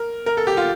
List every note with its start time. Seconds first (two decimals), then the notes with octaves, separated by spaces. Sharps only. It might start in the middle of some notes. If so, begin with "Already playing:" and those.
Already playing: A#4
0.26 A#4
0.37 A4
0.47 G4
0.57 F4